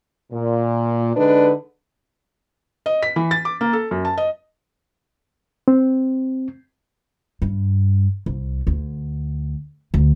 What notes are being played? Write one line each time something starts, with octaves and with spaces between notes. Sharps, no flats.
A#2
D3 G#3 D4 D#4 B4
D#5
B6
E3
A6
D6
A#3
A4
F#2
A5
D#5
C4
G2
C2
D2
D2